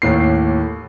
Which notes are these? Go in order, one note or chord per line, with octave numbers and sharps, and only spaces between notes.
D#2 A2 C7